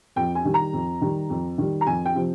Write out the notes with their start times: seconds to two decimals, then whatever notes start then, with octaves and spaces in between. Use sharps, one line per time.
0.16 F2 G5
0.35 G#5
0.45 D#3 G3
0.54 A#5
0.73 F2
1.01 D#3 G3
1.30 F2
1.58 D#3 G3
1.81 A#5
1.87 F2 G#5
2.05 G5
2.15 C3 F3